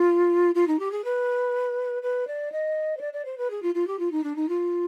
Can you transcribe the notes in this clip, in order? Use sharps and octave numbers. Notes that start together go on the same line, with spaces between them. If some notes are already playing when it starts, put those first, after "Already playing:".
Already playing: F4
F4
D#4
G4
G#4
B4
B4
D5
D#5
C5
D5
D5
C5
B4
G#4
F4
F4
G4
F4
D#4
D4
D#4
F4